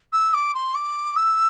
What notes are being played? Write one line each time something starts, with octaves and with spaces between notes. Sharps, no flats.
E6
D6
C6
D6
E6